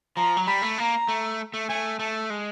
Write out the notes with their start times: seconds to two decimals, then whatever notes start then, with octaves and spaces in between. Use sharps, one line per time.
0.16 F3 A#5
0.37 F#3
0.47 G3 B5
0.62 A3
0.77 A#3 A#5
1.08 A3
1.54 A3
1.69 A3 G#5
1.99 A3 A5
2.30 G#3